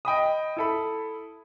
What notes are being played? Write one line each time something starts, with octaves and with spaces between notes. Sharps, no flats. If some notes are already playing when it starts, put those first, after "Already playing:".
D#5 G5 B5 D#6
E4 A4 B5